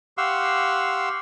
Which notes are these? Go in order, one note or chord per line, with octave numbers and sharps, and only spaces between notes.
G4 F5 F#5 C6 C#6 E6